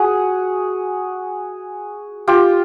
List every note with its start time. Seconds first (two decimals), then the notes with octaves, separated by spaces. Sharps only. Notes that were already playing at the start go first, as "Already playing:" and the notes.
Already playing: F#4 G#4
2.28 F4 G4